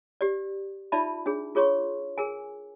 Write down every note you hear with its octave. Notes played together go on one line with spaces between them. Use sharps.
G4 D5
D#4 F4 D5 E5 A5 B5
D4 G#4
F4 G#4 C#5 C6 C#6
G#4 A#4 G#5